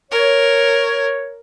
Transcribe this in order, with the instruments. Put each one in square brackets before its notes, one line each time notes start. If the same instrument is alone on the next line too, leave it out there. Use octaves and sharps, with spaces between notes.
[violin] A#4 [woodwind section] C#5